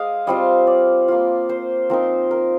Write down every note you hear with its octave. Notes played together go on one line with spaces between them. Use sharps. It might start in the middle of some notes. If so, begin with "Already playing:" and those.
Already playing: G#3 D#5 F5
G3 C4 F4 D#5
D5
A#3 F4
C5
F3 C4 D#4 A#4
A#4